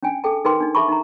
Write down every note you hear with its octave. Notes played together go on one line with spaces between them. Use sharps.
C#4 D4 G5 G#5
G#4 A4 G5 A5
D#4 G#4 A#4 B4 G5 C6
D4 D#4
G#4 E5 A5 B5 C#6
D#4 A#5